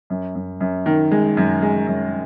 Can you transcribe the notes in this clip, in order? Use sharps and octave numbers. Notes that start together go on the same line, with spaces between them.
F#2
F#2
F#2
D#3
G#3
F#2
G#3
F#2